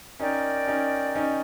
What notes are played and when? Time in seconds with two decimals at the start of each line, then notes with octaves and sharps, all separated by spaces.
0.20 C#4 D#4 A#4 D5 G5
0.67 C#4 D#4
1.15 C#4 D#4